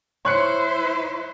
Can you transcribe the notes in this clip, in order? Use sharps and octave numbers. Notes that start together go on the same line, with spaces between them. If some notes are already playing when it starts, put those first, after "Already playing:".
E4 C5 C#5 F#6 C#7